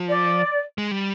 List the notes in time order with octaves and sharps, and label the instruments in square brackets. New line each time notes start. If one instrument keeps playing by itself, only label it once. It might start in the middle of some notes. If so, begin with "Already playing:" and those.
Already playing: [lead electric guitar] F3
[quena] D5
[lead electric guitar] G#3
G3